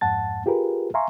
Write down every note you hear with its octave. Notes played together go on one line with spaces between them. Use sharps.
F2 G#2 F#5 A5 A6
F4 G4 G#4 A#4 B4
E5 F5 G#5 A#5 C6 C#6